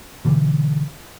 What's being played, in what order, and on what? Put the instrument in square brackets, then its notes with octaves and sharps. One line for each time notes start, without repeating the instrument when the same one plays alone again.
[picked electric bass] B2 D3 E3 G3